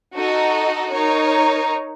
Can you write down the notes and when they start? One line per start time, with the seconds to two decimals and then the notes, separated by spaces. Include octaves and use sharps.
0.15 D#4 F#4 A4 D#5
0.92 D#4 A#4 C#5